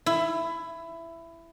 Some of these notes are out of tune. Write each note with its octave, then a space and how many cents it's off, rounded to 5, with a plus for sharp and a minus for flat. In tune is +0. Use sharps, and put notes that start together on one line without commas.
E4 +15